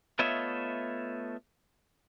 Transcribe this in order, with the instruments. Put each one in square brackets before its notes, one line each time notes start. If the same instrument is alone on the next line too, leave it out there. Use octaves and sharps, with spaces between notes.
[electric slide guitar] A3 B3 F4 C#5 D#5 E5